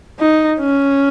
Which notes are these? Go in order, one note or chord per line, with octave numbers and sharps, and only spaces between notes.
D#4
C#4